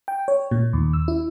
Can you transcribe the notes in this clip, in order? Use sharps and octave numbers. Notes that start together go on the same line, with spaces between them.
G5
C#5
A#2
D#2
E6
E4